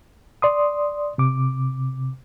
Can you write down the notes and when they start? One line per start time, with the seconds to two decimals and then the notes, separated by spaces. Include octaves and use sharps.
0.42 D5 C6 D#6
1.18 C3 D6